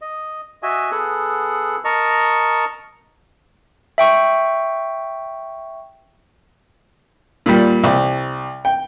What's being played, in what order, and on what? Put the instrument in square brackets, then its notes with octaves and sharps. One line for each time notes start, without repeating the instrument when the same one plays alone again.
[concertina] D#5
F#4 D#5 E5 G#5
B3 G#4 A4 F#5
A#4 D#5 A5 A#5 C#6
[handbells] E5 G5 C#6
[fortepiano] A#2 G3
C2
G5